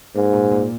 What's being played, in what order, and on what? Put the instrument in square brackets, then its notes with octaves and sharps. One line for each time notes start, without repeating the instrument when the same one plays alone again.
[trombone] G#2 [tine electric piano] A#3
[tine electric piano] A#2
A#2